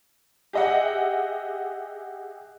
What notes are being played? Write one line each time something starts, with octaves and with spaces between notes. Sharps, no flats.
G4 G#4 D#5 E5 F#5